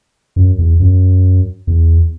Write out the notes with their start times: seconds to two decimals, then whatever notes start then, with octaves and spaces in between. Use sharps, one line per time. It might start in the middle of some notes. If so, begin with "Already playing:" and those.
0.36 F#2
0.59 E2
0.80 F#2
1.67 E2